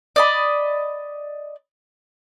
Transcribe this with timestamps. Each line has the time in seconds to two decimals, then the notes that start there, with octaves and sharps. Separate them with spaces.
0.16 D5 D#5 B5